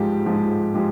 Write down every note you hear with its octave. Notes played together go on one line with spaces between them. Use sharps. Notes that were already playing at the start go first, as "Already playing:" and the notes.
Already playing: G#2 F3 G#3 G4
G#2 F3 G#3
F3 G#3 G4